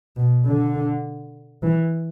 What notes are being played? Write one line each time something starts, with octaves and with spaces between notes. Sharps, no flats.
B2
D3
E3